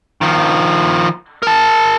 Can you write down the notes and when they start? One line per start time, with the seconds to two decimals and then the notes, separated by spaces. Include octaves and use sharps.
0.21 D#3 F3
1.43 A#4 A5